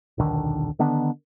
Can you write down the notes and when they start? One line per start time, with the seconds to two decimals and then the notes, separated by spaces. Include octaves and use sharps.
0.18 D#1 B1 D3 D#3
0.79 D3 D#3 B3 D4